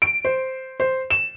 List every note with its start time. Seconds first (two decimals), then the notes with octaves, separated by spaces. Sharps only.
0.02 D7
0.25 C5
0.80 C5
1.10 E7